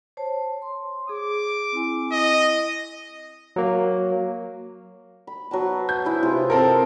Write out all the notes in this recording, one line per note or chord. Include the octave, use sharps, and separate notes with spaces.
C5 C#5 A5
C6
G#4 D6
C4 E4 G#5
D#5
F#3 A#3
B5
F#3 B3 A5
G6
E4 G#4 B4
C3 F4 G#4
C4 A4 A#4